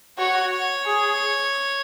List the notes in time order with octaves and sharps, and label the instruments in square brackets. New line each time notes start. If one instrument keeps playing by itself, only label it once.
[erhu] F#4 [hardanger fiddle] C#5
[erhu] G#4